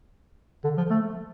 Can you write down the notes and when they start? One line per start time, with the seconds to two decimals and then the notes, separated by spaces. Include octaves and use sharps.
0.64 D3
0.77 F3
0.90 A3